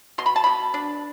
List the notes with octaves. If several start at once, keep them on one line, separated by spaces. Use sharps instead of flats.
B2 C6
B5
A5
B2 B5
D4